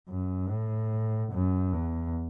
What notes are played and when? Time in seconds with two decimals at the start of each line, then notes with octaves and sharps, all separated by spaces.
0.09 F#2
0.49 A2
1.32 F#2
1.72 E2